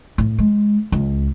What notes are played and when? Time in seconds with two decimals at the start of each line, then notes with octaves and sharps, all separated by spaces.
0.18 A2
0.39 G#3
0.92 C#2